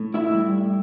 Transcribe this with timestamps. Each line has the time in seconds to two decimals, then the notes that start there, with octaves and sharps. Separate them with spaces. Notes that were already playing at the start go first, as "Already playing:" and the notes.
Already playing: A2
0.14 E4 E5
0.35 G3